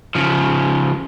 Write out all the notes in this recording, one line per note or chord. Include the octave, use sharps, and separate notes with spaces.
C#3 F3